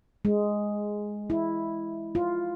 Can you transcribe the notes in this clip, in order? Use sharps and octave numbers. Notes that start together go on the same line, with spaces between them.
G#3
E4
F4